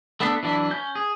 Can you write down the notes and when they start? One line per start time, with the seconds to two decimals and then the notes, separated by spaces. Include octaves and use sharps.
0.20 A3 B3 D4 A4 B4
0.43 E3 F#3 D4 E4
0.70 C#4 G6
0.95 G#4